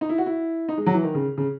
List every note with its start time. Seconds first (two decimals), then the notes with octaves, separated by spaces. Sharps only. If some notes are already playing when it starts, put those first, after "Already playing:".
0.01 D#4
0.09 E4
0.18 F#4
0.26 E4
0.69 D#4
0.77 G#3
0.86 F#3
0.94 E3
1.04 D#3
1.15 C#3
1.37 C#3